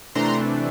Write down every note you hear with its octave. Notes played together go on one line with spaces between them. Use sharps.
C3 E3 A3 D4 A#5 C6